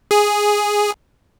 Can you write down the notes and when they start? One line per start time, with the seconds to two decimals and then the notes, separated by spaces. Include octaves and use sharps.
0.11 G#4